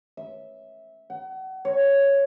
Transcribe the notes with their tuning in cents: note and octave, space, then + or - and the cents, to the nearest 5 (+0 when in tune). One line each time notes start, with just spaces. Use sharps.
E5 -15
F#5 +35
C#5 +0